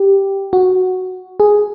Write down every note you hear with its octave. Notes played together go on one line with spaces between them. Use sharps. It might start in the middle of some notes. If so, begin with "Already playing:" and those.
Already playing: G4
F#4
G#4